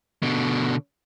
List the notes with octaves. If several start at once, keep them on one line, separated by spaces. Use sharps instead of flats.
B2 D3